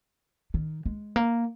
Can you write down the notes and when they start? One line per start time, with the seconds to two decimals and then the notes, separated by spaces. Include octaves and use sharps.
0.54 D#3
0.86 G#3
1.16 A#3